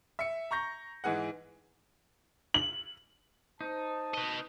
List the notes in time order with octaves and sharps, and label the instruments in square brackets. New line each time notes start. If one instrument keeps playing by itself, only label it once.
[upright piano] E5 C#7
A#5 C#6 G6 A#6
G#2 E3 G#4 F#5
[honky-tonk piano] F#7
[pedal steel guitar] D#4 [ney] C5 [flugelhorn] A5
[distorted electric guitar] B4 D#5